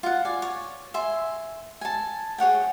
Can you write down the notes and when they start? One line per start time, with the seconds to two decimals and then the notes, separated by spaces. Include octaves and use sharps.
0.03 F4 F#5
0.25 D5 G#5
0.42 C#5
0.94 E5 G#5 C6
1.81 G#5 A5
2.38 G#4 C#5 F#5 G5